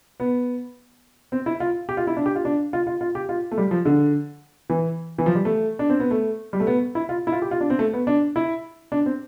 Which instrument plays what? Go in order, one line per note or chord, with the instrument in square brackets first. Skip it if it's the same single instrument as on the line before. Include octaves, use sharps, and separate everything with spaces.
[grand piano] B3
C4
E4
F4
G4
F4
E4
D4
G4
F4
D4
F4
F4
F4
G4
F4
A3
G3
F3
D3
E3
E3
F3
G3
A3
D4
C4
B3
A3
G3
A3
B3
E4
F4
E4
F4
G4
F4
D4
C4
A3
B3
D4
E4
D4
C4